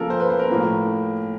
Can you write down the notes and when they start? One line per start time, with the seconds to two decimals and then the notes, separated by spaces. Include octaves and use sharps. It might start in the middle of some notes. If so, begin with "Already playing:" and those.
Already playing: C#3 F3 A#3 A4 A#4
0.10 C5
0.20 B4
0.30 C5
0.39 A#4
0.49 A2 F3 A#3